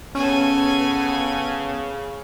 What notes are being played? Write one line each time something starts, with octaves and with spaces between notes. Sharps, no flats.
C#3 B3 C#4 A4 G#5